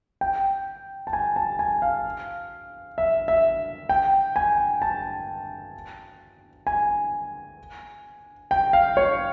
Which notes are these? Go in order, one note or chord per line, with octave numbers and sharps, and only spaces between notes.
G5
A5
G#5
A5
G#5
F5
E5
E5
G5
G#5
A5
G#5
G5
F5
C#5